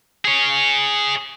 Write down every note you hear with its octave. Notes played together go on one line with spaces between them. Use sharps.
G#4 C#5